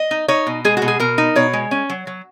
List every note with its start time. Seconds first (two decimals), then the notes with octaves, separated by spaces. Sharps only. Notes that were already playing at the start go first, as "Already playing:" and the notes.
Already playing: D#5
0.11 D#4
0.28 D#4 C#5
0.47 B2
0.65 G#3 G#4
0.77 F#4
0.82 B2
0.88 G#4
1.00 B2 A#4
1.18 D#4
1.36 B2 C#5
1.53 G#3
1.71 C#4
1.90 F#3
2.07 F#3